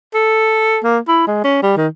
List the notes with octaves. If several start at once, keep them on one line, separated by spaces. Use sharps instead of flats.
A4
A#3
E4
G#3
C#4
G3
D#3